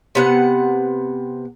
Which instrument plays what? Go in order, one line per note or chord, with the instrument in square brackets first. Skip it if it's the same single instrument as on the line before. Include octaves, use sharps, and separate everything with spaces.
[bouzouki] C3 B3 F#5